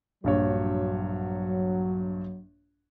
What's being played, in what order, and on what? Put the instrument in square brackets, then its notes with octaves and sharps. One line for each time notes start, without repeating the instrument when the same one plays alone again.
[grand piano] A#1 G2 C#5 [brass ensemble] F#3